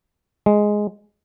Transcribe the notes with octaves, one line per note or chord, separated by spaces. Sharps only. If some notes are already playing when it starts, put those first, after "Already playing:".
G#3